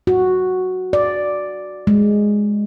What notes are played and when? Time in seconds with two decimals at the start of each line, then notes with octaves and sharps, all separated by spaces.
0.07 F#4
0.93 D5
1.87 G#3